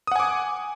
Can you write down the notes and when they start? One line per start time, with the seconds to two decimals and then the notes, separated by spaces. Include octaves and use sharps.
0.07 D#6
0.12 F#5
0.16 G#5
0.20 D6